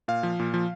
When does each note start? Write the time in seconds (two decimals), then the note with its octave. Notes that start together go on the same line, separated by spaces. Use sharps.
0.08 A#2 F5
0.23 F3
0.39 A#2
0.54 F3